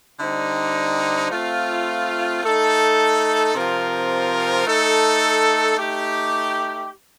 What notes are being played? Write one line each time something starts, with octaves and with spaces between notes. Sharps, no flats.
D3 G3 C4 D#4
A3 C4 F4
A3 D#4 A4
C3 F3 C4 F4 A#4
A3 D#4 A4
A3 D#4 G4